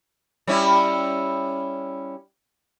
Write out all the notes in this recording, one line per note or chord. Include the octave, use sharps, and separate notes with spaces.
G3 C#4 E4